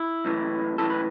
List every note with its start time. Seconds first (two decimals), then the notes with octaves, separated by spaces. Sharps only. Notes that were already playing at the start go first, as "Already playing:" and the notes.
Already playing: E4
0.25 B1 A2 E3
0.78 B1 A2 E3 A4
0.90 B4